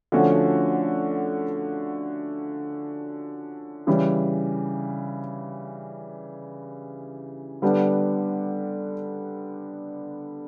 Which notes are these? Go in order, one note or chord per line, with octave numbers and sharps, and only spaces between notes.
D3 F3 A3 C#4 F#4
C#3 E3 G3
D3 G3 B3 D4